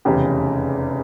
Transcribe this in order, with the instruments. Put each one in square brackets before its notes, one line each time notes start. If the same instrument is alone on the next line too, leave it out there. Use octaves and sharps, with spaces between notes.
[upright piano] F1 E2 C#3 G4